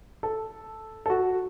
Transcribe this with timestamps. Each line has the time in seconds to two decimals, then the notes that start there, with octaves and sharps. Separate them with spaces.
0.23 A4
1.06 A4
1.10 F#4